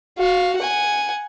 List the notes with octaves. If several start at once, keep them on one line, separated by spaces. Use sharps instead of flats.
F#4 F5
F#5 G#5